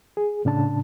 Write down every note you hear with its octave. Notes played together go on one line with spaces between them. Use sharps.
G#4
A2 C#3 D4 A5